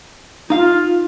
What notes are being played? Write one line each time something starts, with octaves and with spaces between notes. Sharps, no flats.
D#4 F4 F5